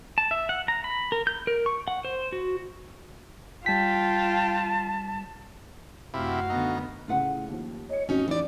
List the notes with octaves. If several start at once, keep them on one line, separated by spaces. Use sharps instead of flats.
A5
E5
F#5
A#5
B5
A#4
G6
A#4
C#6
F#5
C5
F#4
G3 F4 G5 A5 B6
F#2 C3 A3 E4 F#4 F5
D3 B3 D#4
A2 C#3 F4 B4 F#5
D#2 F3
C#5 D#5 C#7
A1 F2 C#4 D#4 F#4
E3 D#4 D5